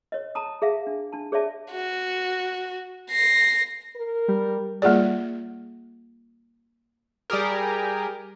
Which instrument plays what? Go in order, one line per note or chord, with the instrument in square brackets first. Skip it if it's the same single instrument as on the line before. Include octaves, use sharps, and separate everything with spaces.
[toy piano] C#5 D#5
A5 A#5 D#6
G#4 E5 F5
D4
D4 A5
G#4 C#5 D5 E5 A5
[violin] F#4
A#6 C7
[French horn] A#4
[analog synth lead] G3
[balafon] G3 A#3 F4 G#4 D5
[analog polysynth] G3 G4 G#4 A#4